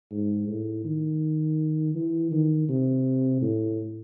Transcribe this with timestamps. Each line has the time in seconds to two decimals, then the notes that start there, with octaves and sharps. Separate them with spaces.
0.11 G#2
0.48 A2
0.85 D#3
1.95 E3
2.31 D#3
2.69 C3
3.42 A2